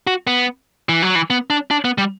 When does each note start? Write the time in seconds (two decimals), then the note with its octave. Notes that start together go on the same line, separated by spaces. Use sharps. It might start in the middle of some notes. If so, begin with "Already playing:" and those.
0.07 F#4
0.27 B3
0.89 E3
1.03 F#3
1.15 E3
1.30 B3
1.50 D4
1.71 D4
1.85 B3
1.98 G3